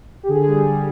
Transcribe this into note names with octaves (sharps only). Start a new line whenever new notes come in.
G4
D3 G#4
G3
G3